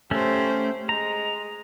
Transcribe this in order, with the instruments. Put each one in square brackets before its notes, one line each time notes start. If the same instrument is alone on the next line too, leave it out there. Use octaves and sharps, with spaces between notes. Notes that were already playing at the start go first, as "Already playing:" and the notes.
[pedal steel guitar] A3 C#4 [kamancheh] G4 C5
[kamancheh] G#3 [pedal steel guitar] A#5